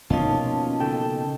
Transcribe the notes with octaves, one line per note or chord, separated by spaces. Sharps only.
B2 F3 A#3 C#4 D#4 F4 D#5 A5
C#3 A4 G5